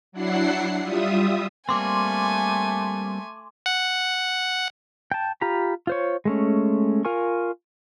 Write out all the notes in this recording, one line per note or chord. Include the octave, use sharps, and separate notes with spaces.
F#3 D4 E4 F#5 C7
G3 F4 E5 D#6
G3 A3 A#3 C4 G#5 C6 D6
F#5
G5 A5
F4 G4 A#5 B5
F4 C5 C#5
G#3 A3 C#4
F4 A#4 G#5 C#6